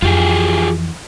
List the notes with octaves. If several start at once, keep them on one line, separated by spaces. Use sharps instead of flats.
F2 E3 F4 G4 G#4